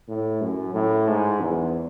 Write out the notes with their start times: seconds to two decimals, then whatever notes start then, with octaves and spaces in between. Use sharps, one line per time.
0.08 A2
0.42 F#2
0.75 A2
1.08 G#2
1.41 E2